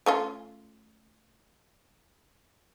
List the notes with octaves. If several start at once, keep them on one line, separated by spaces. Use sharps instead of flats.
A3 C#4 F4